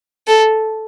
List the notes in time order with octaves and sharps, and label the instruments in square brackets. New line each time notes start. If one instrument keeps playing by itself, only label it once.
[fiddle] A4